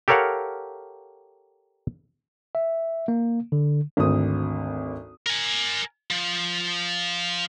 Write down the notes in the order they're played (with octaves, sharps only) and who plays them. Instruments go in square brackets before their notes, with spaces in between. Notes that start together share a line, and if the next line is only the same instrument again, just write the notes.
[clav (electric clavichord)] G4 A4 A#4 C#5 F5 F#5
[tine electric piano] E5
A#3
D3
[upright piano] G#1 D2 C4 D#6
[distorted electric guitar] A#4 G#5
F3